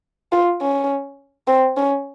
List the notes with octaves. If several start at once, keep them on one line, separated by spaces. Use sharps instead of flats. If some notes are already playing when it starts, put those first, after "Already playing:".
F4
C#4
C4
C#4